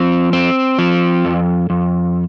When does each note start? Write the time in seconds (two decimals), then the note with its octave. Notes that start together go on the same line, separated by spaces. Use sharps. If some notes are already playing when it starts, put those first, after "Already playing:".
Already playing: F3 C4
0.33 C4
0.79 F3
1.25 F2
1.70 F2